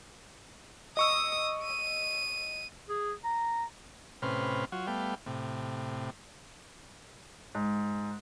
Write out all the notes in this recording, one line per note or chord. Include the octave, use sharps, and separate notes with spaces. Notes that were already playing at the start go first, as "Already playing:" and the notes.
D#5 C#6 D#6 E6
D#7
G#4
A#5
A2 C3 C#4 B4 C5 F6
F#3 F4 F#4
G3 A3 B3 F5 G5
A2 C3
G#2